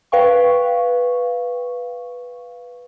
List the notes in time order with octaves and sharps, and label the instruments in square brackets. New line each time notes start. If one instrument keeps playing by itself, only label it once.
[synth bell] B4 F5 G5 C#6